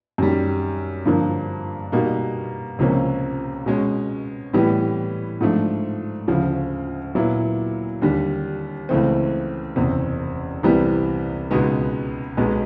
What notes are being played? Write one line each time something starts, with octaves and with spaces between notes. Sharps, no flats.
F#2 D#3 G3
G2 D3 F3 A#3
B2 G3 A#3 D#4
C#2 C3 F3 A#3 C#4
B2 G#3 C#4
A2 E3 G3 B3
G#2 F3 A3 D4
D2 C#3 F3
A#2 F#3 B3 E4
D#2 D3 G3
C#2 C#3 E3 A3 C4
F#1 E2 C3
C2 C3 E3 G3 B3
C#2 B2 G#3 B3 D#4
B1 B2 G#3 B3